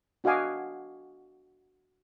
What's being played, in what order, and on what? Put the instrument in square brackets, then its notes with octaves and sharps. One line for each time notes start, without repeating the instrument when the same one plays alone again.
[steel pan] D4 F#4 D#5 F5 G#5 D6